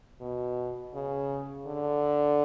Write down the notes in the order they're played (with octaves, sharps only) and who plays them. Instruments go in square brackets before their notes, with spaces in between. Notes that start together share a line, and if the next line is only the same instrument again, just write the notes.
[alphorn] B2
C#3
D3